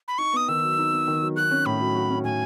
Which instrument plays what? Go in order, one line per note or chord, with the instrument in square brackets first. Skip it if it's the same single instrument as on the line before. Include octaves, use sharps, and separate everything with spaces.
[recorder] B5
[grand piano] D#4 [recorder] C#6
[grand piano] B3 [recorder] D#6
[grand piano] D#3 [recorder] E6
[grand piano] F#3
D#4
B3
D#3
F#3
[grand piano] F#4 [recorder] F#6
[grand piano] C#4
[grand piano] A2 [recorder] B5
[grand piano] F#3
F#4
C#4
[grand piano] A2 [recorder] G#5